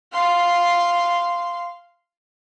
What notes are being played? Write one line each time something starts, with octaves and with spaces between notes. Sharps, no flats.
F5 C6